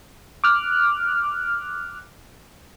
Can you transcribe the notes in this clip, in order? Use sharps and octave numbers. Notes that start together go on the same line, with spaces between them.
D6 F6 F#6